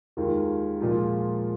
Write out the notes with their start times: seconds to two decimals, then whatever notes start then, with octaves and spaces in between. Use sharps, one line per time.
0.17 D#2 D#3 G#3 F4
0.80 A#2 F3 G#3 F4